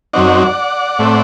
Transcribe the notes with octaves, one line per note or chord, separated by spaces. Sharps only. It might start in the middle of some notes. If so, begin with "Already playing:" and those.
F#2 F#3 C4 D#4 D5 F#5
A2 A3 C4